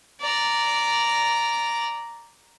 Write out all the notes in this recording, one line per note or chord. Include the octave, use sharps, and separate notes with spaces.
D5 A#5